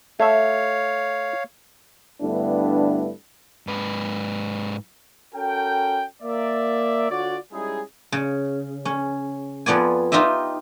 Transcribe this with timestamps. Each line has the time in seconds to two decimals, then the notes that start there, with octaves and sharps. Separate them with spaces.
0.20 A3 C#5 E5 F5
2.21 G2 D3 A3 B3 D4 E4
3.67 G#2 B4
5.35 C#4 F#4 A4 A#4 G5
6.22 A#3 D5 E5
7.11 D3 F4 F#4 C#5 D5
7.53 G3 G#3 C#4 D#4 E4 G#4
8.12 C#3
8.85 C#4
9.66 F2 F3 B3 D5 G#5
10.12 D#4 F4 G4 D#5 E5